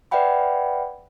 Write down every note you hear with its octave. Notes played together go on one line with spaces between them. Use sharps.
B4 D5 E5 F#5 G5 B5